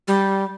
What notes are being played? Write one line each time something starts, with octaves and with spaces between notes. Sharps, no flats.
G3